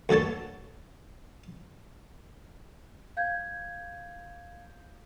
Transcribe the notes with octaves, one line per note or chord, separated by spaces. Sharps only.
D2 F#4 A4 C#5 A5
F5 G6 G#6